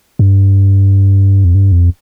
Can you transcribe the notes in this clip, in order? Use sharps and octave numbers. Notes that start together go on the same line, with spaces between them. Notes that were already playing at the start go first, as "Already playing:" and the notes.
G2
F2
G2
F2